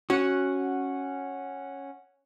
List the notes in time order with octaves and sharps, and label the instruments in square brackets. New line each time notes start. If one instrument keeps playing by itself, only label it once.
[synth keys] C#4 F#5 [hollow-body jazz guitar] F#4